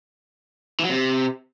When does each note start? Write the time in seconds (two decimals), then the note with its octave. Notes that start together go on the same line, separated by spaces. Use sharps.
0.80 E3
0.85 F#3
0.90 C3